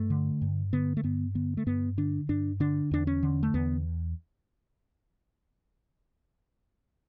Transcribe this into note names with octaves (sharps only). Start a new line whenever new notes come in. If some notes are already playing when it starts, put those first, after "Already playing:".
Already playing: G2 A3
D3
G2
D3 B3
A3
G2 B3
D3 B3
A3
G2 B3
D3 D4
G2 D4
D3 D4
E2 D4
C#4
D3
A3
E2 B3